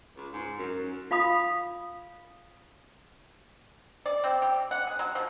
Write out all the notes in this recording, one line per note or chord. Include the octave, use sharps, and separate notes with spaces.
C#2
G#2
F#2
F4 F5 B5 D#6
D5
C4
G4
F#5
G#4
F#3
F3